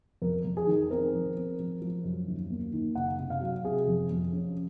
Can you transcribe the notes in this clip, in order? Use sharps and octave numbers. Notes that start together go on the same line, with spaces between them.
F2 A#4
F2
G#4
D#3
C4 A#4
F3
C4
F3
F3
F#2
D#2
A#3
D#3
F#1 F#5
C3
F5
F#3
C3 G#4
F2
F2
C#4